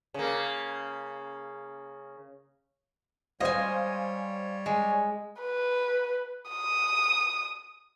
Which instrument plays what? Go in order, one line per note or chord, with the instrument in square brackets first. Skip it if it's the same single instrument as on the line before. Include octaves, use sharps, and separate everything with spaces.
[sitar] C#3 A#3
[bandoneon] G3 C#5 [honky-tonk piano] C5 F5 [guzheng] D#5 G#5
[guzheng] G#3
[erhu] B4
D#6